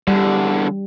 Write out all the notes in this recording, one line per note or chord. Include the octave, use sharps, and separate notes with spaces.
E2 D3 G3